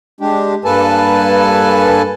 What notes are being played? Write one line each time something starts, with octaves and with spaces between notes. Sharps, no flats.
G#3 D4 G4
G2 A#3 A4 B4 G#5 A5